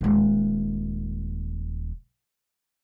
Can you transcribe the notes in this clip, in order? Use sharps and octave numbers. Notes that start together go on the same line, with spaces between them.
D#1 G#3